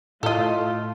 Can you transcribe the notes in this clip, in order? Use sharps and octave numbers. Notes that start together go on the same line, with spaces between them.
A2 A3 F4 A4 D#5